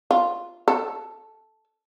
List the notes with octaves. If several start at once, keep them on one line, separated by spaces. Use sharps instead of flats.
F4
A4